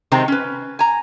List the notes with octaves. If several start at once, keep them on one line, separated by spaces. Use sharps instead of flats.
C3 D#3 G#3 C4 A#5
C#4 B4
G#5 A#5